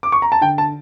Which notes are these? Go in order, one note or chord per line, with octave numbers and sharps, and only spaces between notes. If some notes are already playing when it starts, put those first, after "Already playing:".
D6
C#6
A#5
A5
D3 G5
A5